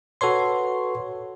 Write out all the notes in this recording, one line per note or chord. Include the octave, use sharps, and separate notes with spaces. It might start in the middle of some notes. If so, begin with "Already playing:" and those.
F#4 A4 B4 C#5 C6